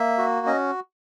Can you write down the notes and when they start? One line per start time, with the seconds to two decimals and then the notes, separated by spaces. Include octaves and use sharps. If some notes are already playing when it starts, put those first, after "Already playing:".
Already playing: A#3 E5
0.18 F#4
0.47 C#4 D#5